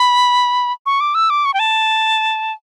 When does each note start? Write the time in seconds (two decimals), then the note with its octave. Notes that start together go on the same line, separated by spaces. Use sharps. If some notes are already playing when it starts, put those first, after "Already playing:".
Already playing: B5
0.86 C#6
1.00 D6
1.15 E6
1.30 D6
1.45 C#6
1.54 G5
1.59 A5